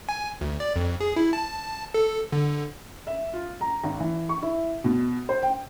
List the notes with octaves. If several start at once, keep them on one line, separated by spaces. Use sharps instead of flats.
G#5
D2
D5
F2
G#4
E4
A5
A4
D3
E5
F4
A#5
G#1
E3
C#6
E4
B2
C5
G5